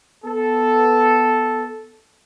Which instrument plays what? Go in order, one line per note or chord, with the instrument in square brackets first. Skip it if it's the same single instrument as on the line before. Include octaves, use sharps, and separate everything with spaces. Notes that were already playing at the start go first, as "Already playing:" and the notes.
[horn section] B3 A4